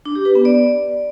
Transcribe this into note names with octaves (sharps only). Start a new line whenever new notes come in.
D4
G4
B4
B3
D5